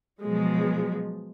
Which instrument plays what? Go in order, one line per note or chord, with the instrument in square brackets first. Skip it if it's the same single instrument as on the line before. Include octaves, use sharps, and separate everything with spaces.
[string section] B2 F3 F#3 G#3